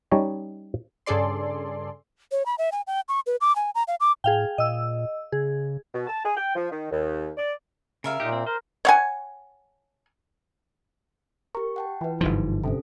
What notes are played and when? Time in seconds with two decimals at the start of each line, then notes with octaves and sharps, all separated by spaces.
0.11 G3 C#4 D#4 C#5 D#5 A5
1.06 G2 C#3 G#4 A4 D5 C6
2.32 C#5
2.46 B5
2.58 E5
2.72 G#5
2.87 G5
3.09 C#6
3.27 B4
3.41 D6
3.56 G#5
3.75 A#5
3.88 F5
4.00 D6
4.24 A2 G#4 F5 G5
4.58 A#2 D#5 E6
5.32 C#3 G#4
5.94 B2
6.07 A5
6.25 G#4
6.37 G5
6.55 F3
6.71 D#3
6.91 D#2
7.37 D5
8.04 C#3 A#4 E5 F5
8.20 A#2 D#4 G4
8.32 C4
8.47 A#4 C5
8.85 C#5 F#5 G#5
11.55 G4 A#4 C#6
11.76 F#5 G5 A5
12.01 E3 F4 B4
12.21 G1 G#2 F3 D#4
12.64 C3 C#4 D4 A4